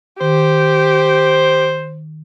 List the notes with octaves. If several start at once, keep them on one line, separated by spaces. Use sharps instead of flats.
D#3 G4 C5